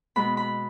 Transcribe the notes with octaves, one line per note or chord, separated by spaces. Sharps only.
B2 G#3 B3 B5
B5